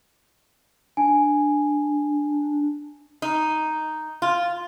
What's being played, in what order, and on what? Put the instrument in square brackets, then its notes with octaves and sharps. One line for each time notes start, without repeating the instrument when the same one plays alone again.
[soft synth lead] D4 [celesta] G#5
[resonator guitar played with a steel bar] D#4
F4